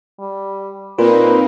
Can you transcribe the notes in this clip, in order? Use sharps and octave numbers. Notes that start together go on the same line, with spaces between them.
G3
A#2 A#3 C4 D#4 F4 B4